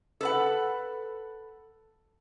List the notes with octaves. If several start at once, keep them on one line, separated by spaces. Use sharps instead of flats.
A4 B4 F#5